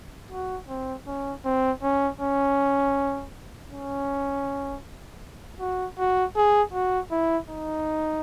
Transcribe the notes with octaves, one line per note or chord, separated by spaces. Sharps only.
F#4
C4
C#4
C4
C#4
C#4
C#4
F#4
F#4
G#4
F#4
E4
D#4